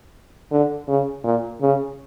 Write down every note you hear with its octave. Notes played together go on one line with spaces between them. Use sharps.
D3
C#3
A#2
C#3